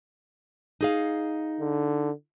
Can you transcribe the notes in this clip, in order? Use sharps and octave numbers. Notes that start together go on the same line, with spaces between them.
D#4 G#4 F5
D3